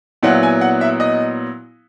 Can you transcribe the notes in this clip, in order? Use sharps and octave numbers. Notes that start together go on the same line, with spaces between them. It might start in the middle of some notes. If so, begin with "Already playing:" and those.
A#2 F#3 B3 E4 F#5
G#5
F#5
E5
D#5